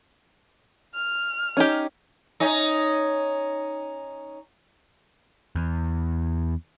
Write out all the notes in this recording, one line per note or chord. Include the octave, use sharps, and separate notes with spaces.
F6
C#4 D#4 G4
C#4 D#4
E2